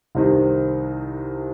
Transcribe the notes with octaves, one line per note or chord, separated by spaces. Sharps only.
C2 C3 D#3